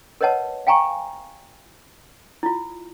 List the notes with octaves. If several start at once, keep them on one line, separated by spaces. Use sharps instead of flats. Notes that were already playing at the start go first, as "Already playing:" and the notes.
A#4 B4 C#5 D#5 F#5 A5
F5 G5 G#5 A#5 C#6
E4 F4